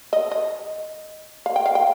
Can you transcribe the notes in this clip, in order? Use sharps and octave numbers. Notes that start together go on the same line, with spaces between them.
D#5
D#5
F5
G5
F5
G5